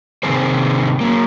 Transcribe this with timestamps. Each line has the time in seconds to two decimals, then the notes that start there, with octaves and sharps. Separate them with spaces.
0.23 C3 D#3 G3 C4 G#4 C5
1.00 F#3 A#3